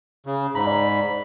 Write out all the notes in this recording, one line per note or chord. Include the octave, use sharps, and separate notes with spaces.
C#3
G#2 A#5 B5
D5